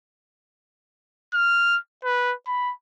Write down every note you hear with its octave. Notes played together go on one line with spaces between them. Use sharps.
F6
B4
B5